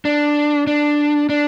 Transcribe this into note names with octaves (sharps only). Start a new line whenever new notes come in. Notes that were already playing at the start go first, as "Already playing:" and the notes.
D4
D4
D4